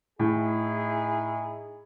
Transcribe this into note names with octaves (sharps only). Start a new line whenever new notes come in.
A2 D#4 E4 G#4